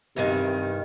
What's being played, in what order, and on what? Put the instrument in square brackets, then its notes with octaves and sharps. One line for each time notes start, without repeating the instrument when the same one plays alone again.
[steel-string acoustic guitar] E2 G2 D#3 [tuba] C3